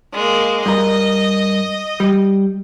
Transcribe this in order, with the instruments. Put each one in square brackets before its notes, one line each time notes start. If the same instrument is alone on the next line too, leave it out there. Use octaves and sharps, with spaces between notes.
[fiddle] G#3 A#3
[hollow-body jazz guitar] G2 A#4 [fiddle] D#5
[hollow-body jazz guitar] G3